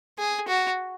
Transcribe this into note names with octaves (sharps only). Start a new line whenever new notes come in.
G#4
F#4